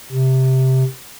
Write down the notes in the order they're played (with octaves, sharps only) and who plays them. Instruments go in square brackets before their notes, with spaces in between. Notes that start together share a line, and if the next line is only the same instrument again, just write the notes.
[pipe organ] C3